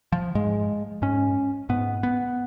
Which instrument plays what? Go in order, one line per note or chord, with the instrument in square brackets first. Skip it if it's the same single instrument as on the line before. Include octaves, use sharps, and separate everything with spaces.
[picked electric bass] F3
G#2 G#3
G#2 C#4
G#2 B3
B3